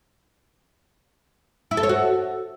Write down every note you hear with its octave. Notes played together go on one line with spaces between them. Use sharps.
E4
A4
C#5
F#4